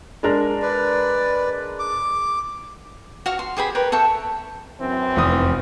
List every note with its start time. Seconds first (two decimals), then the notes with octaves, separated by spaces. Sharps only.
0.23 G#3 D4 A#4
0.62 B4 D5
1.79 D6
3.26 F#4 F5 C#6
3.39 C6
3.57 G4 G#4 C5 B5
3.75 A#4 B4 C#5 G5
3.92 A4 E5 G5 C#6
4.80 F#2 E3 C4
5.16 F1 E2 D#6